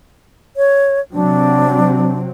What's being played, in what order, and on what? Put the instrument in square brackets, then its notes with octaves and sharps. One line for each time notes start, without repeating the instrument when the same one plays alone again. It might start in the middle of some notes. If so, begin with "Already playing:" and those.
[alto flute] C#5
[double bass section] C3 F#3 C4 [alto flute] D4